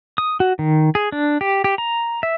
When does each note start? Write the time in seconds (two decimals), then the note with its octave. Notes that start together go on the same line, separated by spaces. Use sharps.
0.18 D#6
0.40 F#4
0.59 D#3
0.95 G#4
1.12 D4
1.41 G4
1.64 G4
1.78 A#5
2.23 E5